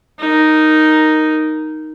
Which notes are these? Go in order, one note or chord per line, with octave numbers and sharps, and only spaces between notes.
D#4 A#4